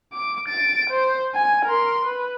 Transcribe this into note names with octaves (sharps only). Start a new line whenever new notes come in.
D6
A6 D7
C5
G#5
A#4 C6
B4